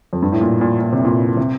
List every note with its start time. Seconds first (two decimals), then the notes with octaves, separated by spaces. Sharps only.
0.13 F2
0.22 G2
0.32 A2
0.41 A#2
0.61 A#2
0.80 A#2
0.92 C3
1.05 A#2
1.37 C3